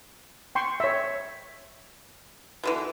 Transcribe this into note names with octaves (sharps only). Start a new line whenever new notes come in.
G5 C6 C#6
C#5 E5
B2 D3 E3